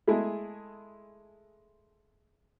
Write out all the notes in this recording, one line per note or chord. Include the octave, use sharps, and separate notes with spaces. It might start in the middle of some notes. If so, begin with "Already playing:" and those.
G#3 A3 E4 G#4